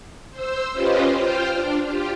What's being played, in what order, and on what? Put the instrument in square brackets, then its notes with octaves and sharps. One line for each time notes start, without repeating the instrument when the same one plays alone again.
[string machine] C5 E6
C#4 F4 G4 B4 C5 D#5
F4 C5 F5 G5
D4
F4 G4